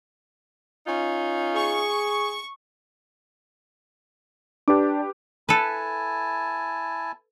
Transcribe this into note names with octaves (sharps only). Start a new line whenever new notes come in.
C#4 D#4 F4
G#4 C#6
D4 G4 B4 D6
E4 A4 B4 G#5 A5